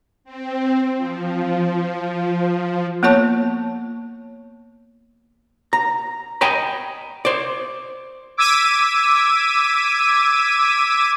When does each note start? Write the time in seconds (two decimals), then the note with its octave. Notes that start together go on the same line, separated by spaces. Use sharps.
0.24 C4
0.97 F3
3.03 A#3 B3 F4 C#5 A5 C#6
5.73 A#5
6.41 D#5 G5 G#5 A#5 B5
7.25 C5 D5
8.37 D6 E6 G#6 B6 D#7